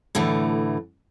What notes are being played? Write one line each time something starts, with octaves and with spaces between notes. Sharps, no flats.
A2 D3 E3 A3